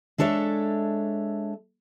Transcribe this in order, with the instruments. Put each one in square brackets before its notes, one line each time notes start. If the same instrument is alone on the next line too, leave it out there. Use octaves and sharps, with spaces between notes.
[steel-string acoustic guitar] G#3 D4 A4 C#5 E5